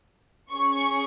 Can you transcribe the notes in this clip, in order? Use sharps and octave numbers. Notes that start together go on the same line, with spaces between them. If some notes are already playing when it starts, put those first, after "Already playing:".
C#4 G#4 C#6